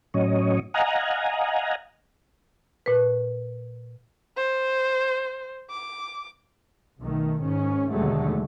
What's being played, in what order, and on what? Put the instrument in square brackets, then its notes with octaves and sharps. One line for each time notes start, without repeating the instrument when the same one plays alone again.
[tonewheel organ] A2 F#3 C#4 C#5 D#5
D#5 F5 F#5 G#5 A#5
[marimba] A#2 B4
[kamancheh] C5
D6
[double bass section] B1 D#3 A3
G#2 D#3 C#4
D#2 B2 D3 F#3 G#3 A3